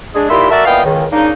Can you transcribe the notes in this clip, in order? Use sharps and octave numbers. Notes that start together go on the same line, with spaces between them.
G#3 D4 G#4
A#2 D#3 E4 G4 E5 C6
F#4 A4 A#4 D5 E5
A#2 E3 B3 D#5 F5 G5
C#2 D#3
C#3 A#3 D4 D#4